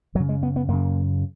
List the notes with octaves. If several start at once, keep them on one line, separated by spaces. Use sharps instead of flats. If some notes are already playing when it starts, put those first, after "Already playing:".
F#2 F#3
C#3
G#3
B3
B3
F#2 C#3 A#3